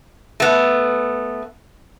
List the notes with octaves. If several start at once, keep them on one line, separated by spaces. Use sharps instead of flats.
A3 B3